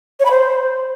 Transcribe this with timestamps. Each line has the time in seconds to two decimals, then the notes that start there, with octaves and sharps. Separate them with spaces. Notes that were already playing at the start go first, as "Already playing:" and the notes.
0.20 C#5
0.25 B5
0.31 C5